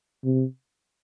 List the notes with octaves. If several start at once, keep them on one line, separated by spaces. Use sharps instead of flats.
C3